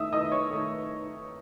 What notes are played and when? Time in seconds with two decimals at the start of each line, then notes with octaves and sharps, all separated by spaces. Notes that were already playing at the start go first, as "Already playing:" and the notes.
Already playing: D#3 A3 D#4 E5 D#6 E6
0.12 D#3 A3 D#4 D#5 D#6
0.31 C#5 C#6
0.51 D#3 A3 D#4